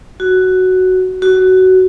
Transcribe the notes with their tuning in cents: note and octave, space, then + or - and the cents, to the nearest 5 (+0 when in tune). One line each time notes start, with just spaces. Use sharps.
F#4 +5
F#4 +15